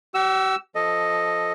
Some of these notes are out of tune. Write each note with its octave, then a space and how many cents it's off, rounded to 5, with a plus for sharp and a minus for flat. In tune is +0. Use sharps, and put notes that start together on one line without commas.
G4 -45 F#5 +10 E6 +5
F3 -5 A4 +0 D#5 +0